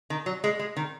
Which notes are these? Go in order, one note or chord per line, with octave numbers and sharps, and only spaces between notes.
D#3
F#3
G#3
G#3
D#3